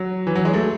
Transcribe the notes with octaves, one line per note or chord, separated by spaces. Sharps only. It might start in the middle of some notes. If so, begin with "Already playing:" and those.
Already playing: F#3
E3
F#3
G#3
A3